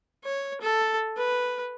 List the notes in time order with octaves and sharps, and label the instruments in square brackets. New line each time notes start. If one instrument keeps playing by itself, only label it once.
[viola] C#5
A4
B4